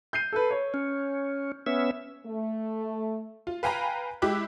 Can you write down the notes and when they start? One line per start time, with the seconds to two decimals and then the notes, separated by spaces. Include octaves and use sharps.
0.13 G6 C7 D#7
0.32 A4 B4
0.51 C#5
0.74 C#4
1.67 B3 C#4 E5
2.26 A3
3.47 F4
3.63 B4 F5 G5 G#5 A#5 B5
4.22 G#3 E4 G4 D6 F#6